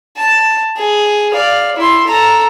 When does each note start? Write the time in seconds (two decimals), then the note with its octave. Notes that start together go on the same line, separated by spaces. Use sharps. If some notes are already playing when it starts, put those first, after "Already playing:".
0.17 A5
0.77 G#4
1.32 D5 F5
1.76 E4 C6
2.07 A4 A#5